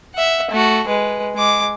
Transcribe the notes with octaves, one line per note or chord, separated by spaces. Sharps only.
E5 F#5
A3 F#4
G#3 B4
G#3 D6